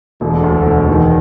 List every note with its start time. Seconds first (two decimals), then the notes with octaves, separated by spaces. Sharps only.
0.21 E1 D3
0.44 D2
0.66 E1
0.88 E1 D#3